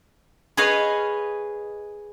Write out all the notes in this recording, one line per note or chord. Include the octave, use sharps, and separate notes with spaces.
G#4 B4 C#5 D#5 F5